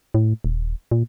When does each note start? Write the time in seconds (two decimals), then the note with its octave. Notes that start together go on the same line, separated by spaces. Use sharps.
0.14 A2
0.44 D#1
0.91 A#2